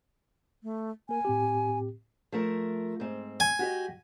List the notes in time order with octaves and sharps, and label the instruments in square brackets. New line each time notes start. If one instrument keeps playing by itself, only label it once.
[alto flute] A3
[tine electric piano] A#3 A#4 [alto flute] G#5
[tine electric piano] A2 C4 G4
[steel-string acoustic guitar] F3 A3 A#4
G#2 C4
[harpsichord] G#5
[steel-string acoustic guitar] F#4 G4 D#5